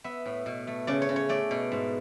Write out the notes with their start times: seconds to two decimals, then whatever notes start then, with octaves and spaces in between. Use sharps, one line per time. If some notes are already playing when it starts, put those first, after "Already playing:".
0.04 B3 E5
0.26 A2
0.46 B2
0.67 A3
0.87 C#3 D5
1.02 C#5
1.09 C#3
1.16 C#5
1.29 A3 D5
1.51 B2
1.72 G#2